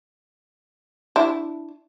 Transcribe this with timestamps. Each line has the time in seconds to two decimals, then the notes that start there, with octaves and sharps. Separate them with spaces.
1.16 D4 E4